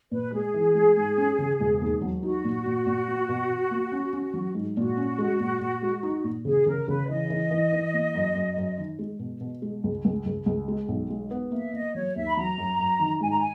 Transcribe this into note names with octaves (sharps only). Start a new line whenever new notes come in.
A#2 B4
G#3 G#4
E3
G#3
G#2
C#4
C#3
E1
D#2
F#3
D#4 F#4
A#2
A#2
A#2
A#3
B2
B2
A#3
C#4
C#4
F#3
G#2
A#2 F#4
C#4
G#3
A#2
A#2
G#3
D#4
A#2
C#3 G#4
C#3 A#4
C#3 B4
E3 D#5
E3
E3
E3
A#3
F#2
F#2
F#2
D#3
G#3
B2
B2
G#3
C#2
C#2
C#2
C#2
G#3
B1
G#3
B3
A#3 E5
A#3 D#5
F#3 C#5
D#2 E5
B5
F#3 A#5
F#2
F#2
D#3
G#2 G#5
A#5
G#5